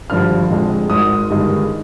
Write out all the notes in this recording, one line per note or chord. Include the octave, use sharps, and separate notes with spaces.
G#1 G2 D3 F3 F6
F1 F2 D3 G#3
G#1 G#2 D#3 D#6
G1 G2 D#3 G#3